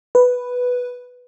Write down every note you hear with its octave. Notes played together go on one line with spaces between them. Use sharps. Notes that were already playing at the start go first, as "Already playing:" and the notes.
B4